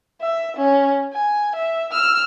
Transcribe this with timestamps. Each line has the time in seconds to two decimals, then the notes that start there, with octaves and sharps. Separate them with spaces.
0.21 E5
0.56 C#4
1.13 G#5
1.56 E5
1.92 E6 F6